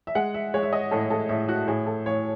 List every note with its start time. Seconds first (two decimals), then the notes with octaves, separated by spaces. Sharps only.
0.07 E5
0.15 G#3 F#5
0.34 E5
0.54 G#3 C#5
0.63 E5
0.73 D#5
0.91 A2 A4
1.10 A4
1.29 A2 E5
1.49 F#4
1.68 A2 G#4
1.86 A4
2.06 A2 C#5